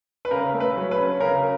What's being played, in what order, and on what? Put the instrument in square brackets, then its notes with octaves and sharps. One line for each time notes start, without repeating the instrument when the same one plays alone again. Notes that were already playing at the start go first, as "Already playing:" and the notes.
[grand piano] B4
C#3 A#4
A3
B4
F#3
B4
C#4
C#3 A#4